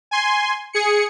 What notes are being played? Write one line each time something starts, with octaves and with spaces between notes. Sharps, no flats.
G#5 C6
G#4 C#7